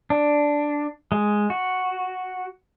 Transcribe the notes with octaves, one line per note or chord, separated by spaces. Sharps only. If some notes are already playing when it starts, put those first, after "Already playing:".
D4
G#3
F#4